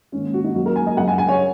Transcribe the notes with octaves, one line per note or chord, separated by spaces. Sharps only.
G#2 D#3 A#3 C#4
F#4
D#4
F#2 F#3 A#3 F#4
A#4
G#5
D#5
F#2 C#3 G#3 F#5
G#5
G#5
C#5